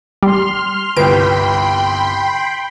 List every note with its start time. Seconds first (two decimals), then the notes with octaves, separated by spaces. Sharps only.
0.23 G3 C6 F6
0.97 G1 C2 F4 B4 G5 B5 C6 D7